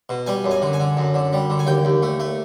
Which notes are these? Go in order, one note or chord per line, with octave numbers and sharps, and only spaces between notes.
B2
G3 G#5
F#2
G#5
D3
G#5
D3
F#2
D3
G3
D3
G#5
D#2 G5
D#2
A3
A3